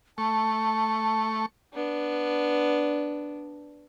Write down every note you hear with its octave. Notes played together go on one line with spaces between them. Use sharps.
A3 A5 C#6
B3 D4